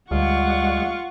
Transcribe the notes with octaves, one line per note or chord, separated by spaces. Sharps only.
D2 G3 G#3 F4 F#5 C#6